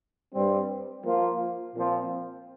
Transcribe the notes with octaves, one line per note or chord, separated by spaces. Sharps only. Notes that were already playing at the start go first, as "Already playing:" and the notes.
G2 G3 C4
F3 A#3 F4
A#2 F3 C4 F4